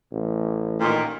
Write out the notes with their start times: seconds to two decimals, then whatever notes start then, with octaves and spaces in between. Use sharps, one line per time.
0.12 A1
0.80 A#2 D#3